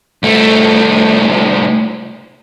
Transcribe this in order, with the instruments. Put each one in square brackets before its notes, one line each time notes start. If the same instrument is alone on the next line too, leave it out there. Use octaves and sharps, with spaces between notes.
[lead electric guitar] C2 A3